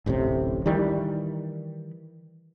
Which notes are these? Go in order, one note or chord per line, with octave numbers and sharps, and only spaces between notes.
D1 A1 A2 C3
D#3 E3 G3